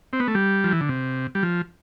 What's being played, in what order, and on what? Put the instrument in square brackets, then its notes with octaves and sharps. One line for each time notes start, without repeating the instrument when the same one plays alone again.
[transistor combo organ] C4
B3
A3
G3
F3
E3
D3
C3
G3
F3